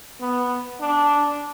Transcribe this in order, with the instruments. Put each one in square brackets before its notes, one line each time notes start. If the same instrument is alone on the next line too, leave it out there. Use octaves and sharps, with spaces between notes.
[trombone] B3
D4